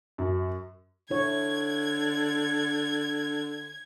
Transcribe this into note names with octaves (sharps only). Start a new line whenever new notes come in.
F#2
D3 E4 C#5 G#6